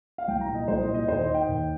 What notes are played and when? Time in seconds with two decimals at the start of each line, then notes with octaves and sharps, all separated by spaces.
0.18 F5
0.28 C2 G5
0.41 A#5
0.48 A#2
0.55 D#5
0.68 C2 C5
0.81 D#5
0.87 A#2
0.94 D#5
1.08 D#2 C5
1.21 D#5
1.28 D#3
1.34 G5
1.48 D#2